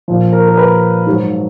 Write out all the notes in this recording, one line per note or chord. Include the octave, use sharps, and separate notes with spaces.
A#2 F3
A#4
A#4
B4
G#2 F#3